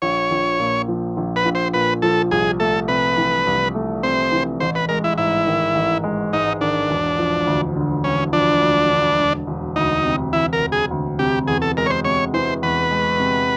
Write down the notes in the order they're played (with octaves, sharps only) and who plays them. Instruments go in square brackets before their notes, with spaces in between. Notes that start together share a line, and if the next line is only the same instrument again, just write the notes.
[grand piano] A#1 [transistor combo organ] C#5
[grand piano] A#1
A#2
F3
A#1
[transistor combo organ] B4
[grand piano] A#1
[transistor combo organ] C5
[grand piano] A#2 [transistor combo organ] B4
[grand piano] F3 [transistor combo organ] A4
[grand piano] C2 [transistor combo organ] G#4
[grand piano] A3 [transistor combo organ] A4
[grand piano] C3 [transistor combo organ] B4
[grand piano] E3
C2
A3
[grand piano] C3 [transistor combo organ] C5
[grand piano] E3
[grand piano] A1 [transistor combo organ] C5
[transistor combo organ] B4
[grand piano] G#3 [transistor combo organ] A#4
[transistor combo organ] E4
[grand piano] G#2 [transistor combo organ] E4
[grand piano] D#3
A1
G#3
[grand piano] G#2 [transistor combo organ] D#4
[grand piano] D#3 [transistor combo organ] D4
[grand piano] E1
F3
D2
D3
[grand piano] E1 [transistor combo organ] C#4
[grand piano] F3 [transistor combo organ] D4
[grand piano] D2
D3
E1
E1
[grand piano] D2 [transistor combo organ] D#4
[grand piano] C3
[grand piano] E1 [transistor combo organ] E4
[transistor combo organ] A#4
[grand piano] E1
[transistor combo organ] G#4
[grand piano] D2
[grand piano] C3 [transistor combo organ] G4
[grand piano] E2 [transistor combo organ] G#4
[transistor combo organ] A4
[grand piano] G#3 [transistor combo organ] A#4
[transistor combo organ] C#5
C5
[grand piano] C3 [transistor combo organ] C#5
[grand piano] E3 [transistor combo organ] C5
[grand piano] E2 [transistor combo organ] B4
[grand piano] G#3
C3